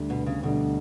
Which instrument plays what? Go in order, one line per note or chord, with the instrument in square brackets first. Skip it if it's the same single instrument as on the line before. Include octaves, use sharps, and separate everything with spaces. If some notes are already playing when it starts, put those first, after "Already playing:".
Already playing: [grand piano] D2 D3 G3
[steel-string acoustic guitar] B2
C#3
[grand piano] D2 D3 G3 [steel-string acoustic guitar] B2